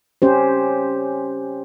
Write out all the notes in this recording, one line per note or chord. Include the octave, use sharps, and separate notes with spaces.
C#4 G4 C5